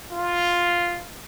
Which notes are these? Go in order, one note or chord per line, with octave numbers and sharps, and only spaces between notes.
F4